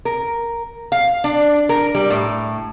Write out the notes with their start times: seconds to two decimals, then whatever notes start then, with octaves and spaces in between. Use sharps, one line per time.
0.05 A#4
0.92 F5
1.24 D4
1.69 A#4
1.95 G3
2.10 A2